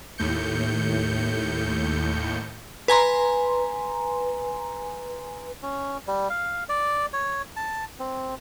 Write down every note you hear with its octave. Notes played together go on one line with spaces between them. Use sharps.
D#2 A2 G6 C#7
B4 G#5 A#5 C6
C#4
G3
F5
D5
C#5
A5
C4